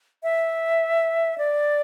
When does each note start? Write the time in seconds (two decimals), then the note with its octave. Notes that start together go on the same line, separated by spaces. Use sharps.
0.23 E5
1.38 D5